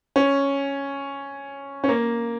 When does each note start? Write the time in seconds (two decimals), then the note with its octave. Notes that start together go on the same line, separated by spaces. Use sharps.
0.16 C#4
1.84 C#4
1.89 A#3